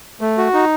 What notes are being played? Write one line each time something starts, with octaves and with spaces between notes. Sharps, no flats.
A3
F#4
D#4